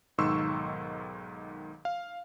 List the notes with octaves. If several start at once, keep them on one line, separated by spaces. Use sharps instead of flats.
B1 G#2 D#3 C6 C#6 E6
F5